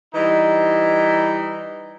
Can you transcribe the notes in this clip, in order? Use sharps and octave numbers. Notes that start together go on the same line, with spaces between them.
E3 G3 D#4